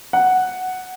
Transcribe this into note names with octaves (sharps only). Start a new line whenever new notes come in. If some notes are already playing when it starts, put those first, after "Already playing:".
F#5